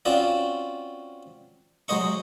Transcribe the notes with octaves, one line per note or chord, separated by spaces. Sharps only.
C4 C#4 F4 F#4 D5
F#3 G#3 C5 D#5 C#6